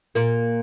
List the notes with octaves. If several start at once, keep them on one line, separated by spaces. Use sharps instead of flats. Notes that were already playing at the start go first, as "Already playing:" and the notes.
A#2 A#3